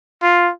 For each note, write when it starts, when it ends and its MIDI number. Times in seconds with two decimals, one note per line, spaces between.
0.22 0.51 65